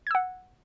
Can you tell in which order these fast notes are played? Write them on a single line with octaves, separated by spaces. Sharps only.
G#6 E6 F#5